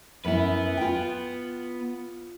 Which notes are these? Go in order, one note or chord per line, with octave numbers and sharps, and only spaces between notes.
F#2 B3 E4 B4
F4 G5